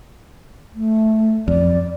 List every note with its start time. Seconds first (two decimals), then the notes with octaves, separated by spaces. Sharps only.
0.75 A3
1.48 F2 D5